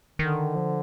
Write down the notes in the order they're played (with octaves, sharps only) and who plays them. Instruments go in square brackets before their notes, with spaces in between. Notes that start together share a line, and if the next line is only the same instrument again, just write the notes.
[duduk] D3 [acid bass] D#3
[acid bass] F3